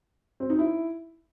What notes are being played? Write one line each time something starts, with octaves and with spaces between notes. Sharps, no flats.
C4
D#4
E4